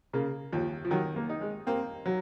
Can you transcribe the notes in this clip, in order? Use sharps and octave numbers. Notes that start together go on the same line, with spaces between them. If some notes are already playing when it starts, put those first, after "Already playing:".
C#3 A#3
D#2 F3
F3
D#3 F#3
A#3
D#4
G#3
A#3 C4
F#3